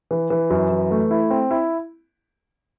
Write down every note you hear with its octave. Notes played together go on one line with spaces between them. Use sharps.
E3
E3
F#2
E3
A3
E4
C4
E4